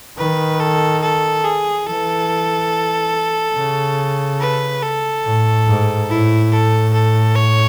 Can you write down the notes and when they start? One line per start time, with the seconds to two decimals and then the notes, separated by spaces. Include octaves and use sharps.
0.18 D#3 B4
0.61 A4
1.03 A4
1.44 G#4
1.86 E3 A4
3.56 C#3
4.41 B4
4.83 A4
5.25 A2
5.67 G#2
6.09 A2 E4
6.51 A4
6.94 A4
7.36 C#5